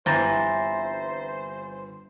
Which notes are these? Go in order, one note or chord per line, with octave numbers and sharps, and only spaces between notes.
G1 C3 E3 C5 A#5 A6 A#6